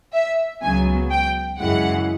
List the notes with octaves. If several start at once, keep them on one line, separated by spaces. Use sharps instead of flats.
E5
C#2 C#3 F#3 B3 G#5
G5
F#2 C#3 E3 G#3 F#5